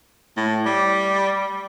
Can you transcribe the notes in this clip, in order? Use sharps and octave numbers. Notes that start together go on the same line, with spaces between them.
A2
G3